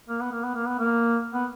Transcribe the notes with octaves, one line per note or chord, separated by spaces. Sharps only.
A#3
B3
A#3
B3
A#3
B3
A#3
B3